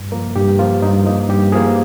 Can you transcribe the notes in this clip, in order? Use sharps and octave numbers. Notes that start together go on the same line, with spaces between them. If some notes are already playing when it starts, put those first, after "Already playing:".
Already playing: G2
F3 A#3 A#4
G2 G4
F3 A#3 F4
G2 D#4
F3 A#3 D#4
G2 G4
F3 A#3 G#4